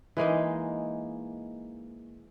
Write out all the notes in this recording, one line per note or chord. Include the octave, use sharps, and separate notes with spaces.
E3 G#3 A#3 D#4